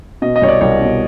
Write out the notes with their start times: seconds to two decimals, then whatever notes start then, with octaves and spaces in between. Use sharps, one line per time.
0.22 B2 D#5
0.36 D#5
0.42 C2 C#5
0.48 D5
0.61 C2 C#5
0.81 B2